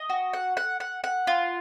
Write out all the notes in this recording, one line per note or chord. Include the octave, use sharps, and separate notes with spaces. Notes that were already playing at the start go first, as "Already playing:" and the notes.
Already playing: D#5
F#4
F#5
F#5
F#5
F#5
F4